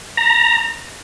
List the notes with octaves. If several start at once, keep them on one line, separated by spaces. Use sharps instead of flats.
A#5